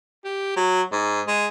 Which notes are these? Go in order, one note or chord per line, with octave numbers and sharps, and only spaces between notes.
G4
F#3
G#2
G#3